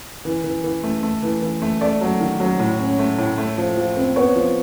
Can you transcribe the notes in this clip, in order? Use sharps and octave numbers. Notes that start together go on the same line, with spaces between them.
E3
E3
E3
A3
A3
E3
E3
A3
A3 D5
F#3
D#3
F#3
A2
C#4
A3
A2
A3
F3
F3
C4
B3 C#5
F3